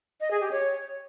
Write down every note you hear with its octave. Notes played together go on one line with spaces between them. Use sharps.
D#5
G#4
G4
C#5